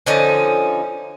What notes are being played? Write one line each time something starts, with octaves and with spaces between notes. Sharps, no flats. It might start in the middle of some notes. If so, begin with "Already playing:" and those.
D3 F3 C#4 D#4